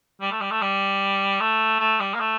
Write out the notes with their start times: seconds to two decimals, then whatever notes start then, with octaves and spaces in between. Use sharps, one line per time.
0.21 G3
0.32 A3
0.41 G3
0.50 A3
0.62 G3
1.40 A3
1.80 A3
2.00 G3
2.15 A#3
2.20 A3